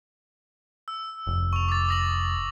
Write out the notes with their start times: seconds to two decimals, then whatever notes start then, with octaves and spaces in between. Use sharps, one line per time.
0.88 E6
1.27 F1
1.53 C#6 F7
1.68 D6 A6
1.89 D#6 A#6 F#7